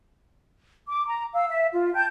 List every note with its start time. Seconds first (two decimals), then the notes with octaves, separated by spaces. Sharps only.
0.88 D6
1.07 A#5
1.34 F5 E6
1.49 E5
1.73 F4
1.94 G5 A5 G6